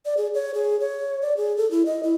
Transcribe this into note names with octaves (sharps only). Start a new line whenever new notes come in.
D5
G#4
C#5
G#4
C#5
D5
G#4
A4
E4
D#5
E4